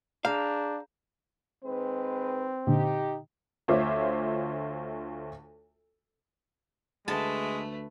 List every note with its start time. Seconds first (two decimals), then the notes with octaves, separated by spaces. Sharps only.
0.25 D4 G#4 F5 A#5 G6
1.64 D#3 G#3 C4 B4
2.67 A#2 D3 D#4 G4
3.68 D2 F4 C5 C#5 E5 D6
7.08 D2 G#3 A3 B4 A5